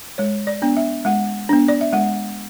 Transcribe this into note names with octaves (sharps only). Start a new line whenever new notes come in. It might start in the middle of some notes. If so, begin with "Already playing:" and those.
G#3 C#5
D5
B3 D4
E5
G#3 F#5
B3 D4
D5
E5
G#3 F#5